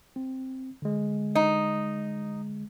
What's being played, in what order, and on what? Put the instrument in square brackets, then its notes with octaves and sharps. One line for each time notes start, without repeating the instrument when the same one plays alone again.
[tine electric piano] C4
D3 G#3
[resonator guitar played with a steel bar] D#4